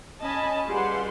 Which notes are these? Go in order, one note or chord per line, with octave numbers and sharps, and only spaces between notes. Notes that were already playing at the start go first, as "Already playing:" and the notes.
C#4 D#5 G#5 A5 B5
G3 F4 G#4 B4 F#5 C6